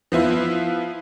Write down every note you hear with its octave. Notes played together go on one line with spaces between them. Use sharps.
F3 B3 E4 F4